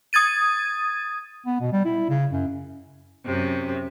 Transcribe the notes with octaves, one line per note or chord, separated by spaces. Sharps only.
D#6 G#6 A6 D#7
B3
B2
G3
E4
C#3
F#2
F#2 C3